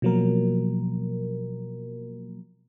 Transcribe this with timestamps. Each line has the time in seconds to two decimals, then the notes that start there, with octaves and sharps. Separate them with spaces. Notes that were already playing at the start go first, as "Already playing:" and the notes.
0.02 B2 F3 F#3 A#3 A#4